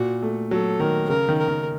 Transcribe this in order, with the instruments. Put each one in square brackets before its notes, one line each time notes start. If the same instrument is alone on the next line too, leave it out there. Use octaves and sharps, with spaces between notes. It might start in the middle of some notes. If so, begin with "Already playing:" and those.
Already playing: [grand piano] A#2 [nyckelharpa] F#4
[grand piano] A3
[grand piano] F#3 [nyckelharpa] A4
[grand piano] D#3 [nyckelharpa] A#4
[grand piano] C#3 [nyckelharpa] A#4
[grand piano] D#3
[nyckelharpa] A#4
[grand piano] D#3